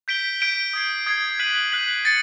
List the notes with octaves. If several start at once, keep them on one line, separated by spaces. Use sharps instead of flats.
G6 B6 D7 G7
G6 B6 D7 G7
D#6 G#6 C7
D#6 G#6 C7
F#6 B6 D#7 F#7
F#6 B6 D#7 F#7
A6 C#7